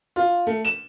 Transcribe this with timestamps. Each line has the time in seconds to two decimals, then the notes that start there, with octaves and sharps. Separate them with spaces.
0.16 F4
0.47 A3
0.65 E7